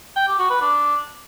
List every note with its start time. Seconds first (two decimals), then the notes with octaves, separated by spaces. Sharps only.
0.16 G5
0.27 G4
0.39 F#4
0.50 B4
0.61 D4